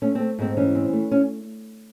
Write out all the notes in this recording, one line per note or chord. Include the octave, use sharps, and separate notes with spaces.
A3 C#4
A3 C4
G#2 C4
E3 C#4
C4
A3
C#4